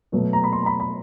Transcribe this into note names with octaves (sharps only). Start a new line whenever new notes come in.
B2 F#3 A3
A#5
B5
C6
A#5
B5
B5